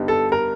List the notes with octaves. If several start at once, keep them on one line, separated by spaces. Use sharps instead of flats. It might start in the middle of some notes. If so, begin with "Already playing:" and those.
Already playing: G2 D3 G3 B3 D#4
A4
A#4